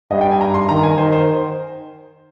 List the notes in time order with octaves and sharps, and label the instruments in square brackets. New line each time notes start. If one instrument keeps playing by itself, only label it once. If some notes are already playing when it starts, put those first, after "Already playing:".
[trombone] G2 [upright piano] D#5
[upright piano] G5
G#5
A#5
C6
[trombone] D#3 [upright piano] A#5
[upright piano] G#5
[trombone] D#3 [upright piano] C5
[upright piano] C5